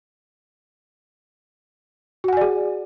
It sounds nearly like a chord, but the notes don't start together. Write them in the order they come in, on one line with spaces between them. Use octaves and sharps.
F#4 F#5 G#5 D5 G#4